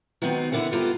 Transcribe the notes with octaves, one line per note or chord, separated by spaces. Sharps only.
D#3 F#3 B3 C4 D#4
D3 E4 A#4 F#5
G2 B3 F4 G4 A4 A#5